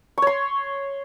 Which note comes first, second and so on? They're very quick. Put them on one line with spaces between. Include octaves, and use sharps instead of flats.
C#6 C#5 C6